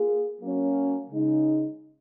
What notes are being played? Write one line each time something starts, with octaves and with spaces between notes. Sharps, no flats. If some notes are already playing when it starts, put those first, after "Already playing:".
Already playing: A#3 F4 G#4
F#3 A#3 C#4
C#3 G#3 D#4